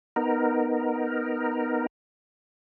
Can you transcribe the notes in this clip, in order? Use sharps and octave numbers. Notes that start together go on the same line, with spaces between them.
B3 D#4 A#4